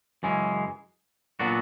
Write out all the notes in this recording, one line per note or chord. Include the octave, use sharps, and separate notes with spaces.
F#2 C#3 E3 G#3 C#4
A#2 F#3 B3 D4 F#4